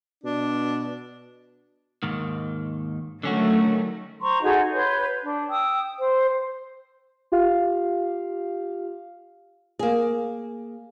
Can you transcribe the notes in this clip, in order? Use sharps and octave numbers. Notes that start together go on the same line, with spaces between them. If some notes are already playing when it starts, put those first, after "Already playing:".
B2 D4
D#2 G#2 D#3
D3 D#3 F#3 A3 C#4 F#4
C5 A#5 C6 C#6
D#4 F#4 G#4 A4
B4 C#5 C6 G6
D4
G5 D#6 E6
C5
F4 G4 F5
A#3 G#4